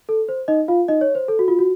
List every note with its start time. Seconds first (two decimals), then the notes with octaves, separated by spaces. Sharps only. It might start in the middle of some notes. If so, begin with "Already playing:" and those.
0.09 A4
0.29 C5
0.48 D#4 D#5
0.68 F4 F5
0.88 D#4 D#5
1.01 C#5
1.15 C5
1.28 A4
1.39 F#4
1.48 F4
1.59 F#4